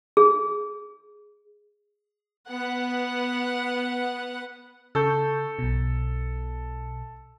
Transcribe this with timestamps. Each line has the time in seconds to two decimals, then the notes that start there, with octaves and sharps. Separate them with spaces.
0.17 G#4
2.47 B3 F#5
4.95 C#3 A4 C#6 G6
5.59 B1 B2